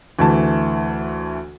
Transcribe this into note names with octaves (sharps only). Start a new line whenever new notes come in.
D2 E3 A3 A5